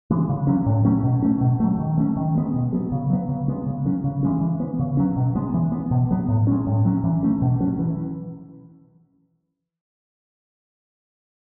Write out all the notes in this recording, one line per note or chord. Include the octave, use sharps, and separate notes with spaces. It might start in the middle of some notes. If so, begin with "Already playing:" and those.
E3 G#3
C#3
F#3 C#4
A2
F#3 A3 C#4
B2
A3 C#4
B2
F#3 A3
D#3
A3 C#4
D#3
G#3 B3
B2
F#3 B3
C#3
F#3 B3
C#3
G#3 B3
C#3
F#3 C#4
C#3
E3 G#3 C#4
E3
B3
C#3
F#3 C#4
B2
G#3 B3
E3
B3
B2
F#3 B3
A2
G#3 C#4
A2
F#3 C#4
E3
A3 C#4
B2
F#3 C#4
E3